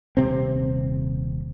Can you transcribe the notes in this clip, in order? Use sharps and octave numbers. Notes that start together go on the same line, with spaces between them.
D#1 C3 C4